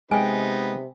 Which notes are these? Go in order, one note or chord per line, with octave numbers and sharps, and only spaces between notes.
C3 G#3 B3 D#4 B4 G5 G#5